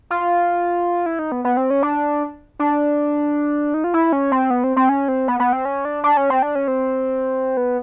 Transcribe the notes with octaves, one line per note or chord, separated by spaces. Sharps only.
F4
E4
D#4
B3
B3
C4
C#4
D4
D4
D#4
F4
E4
C#4
C4
B3
C4
C4
C#4
C4
B3
B3
C4
C#4
D4
D4
C#4
C4
D4
C#4
C4
B3